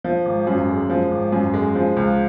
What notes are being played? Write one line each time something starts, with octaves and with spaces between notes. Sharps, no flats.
F3
G#1
F#2
G#3
F3
G#1
F#2
G#3
F3
C#2